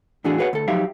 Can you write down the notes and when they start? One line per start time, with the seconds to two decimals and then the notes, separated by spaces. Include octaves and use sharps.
0.24 A2 D3 E3 D4 F#4 G#4
0.38 F#4 G#4 B4 C#5 F#5
0.53 D2 A4
0.68 F3 F#3 D#4 G4 E5 F5